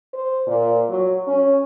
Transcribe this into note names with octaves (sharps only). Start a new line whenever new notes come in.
C5
A#2
F#3
C#4